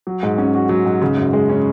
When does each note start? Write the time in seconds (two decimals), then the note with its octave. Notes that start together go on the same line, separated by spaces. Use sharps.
0.07 F#3
0.23 G#2
0.38 C#4
0.55 F#4
0.69 F#3
0.85 G#2
1.01 C#3
1.17 F#2
1.33 G#3
1.49 C#4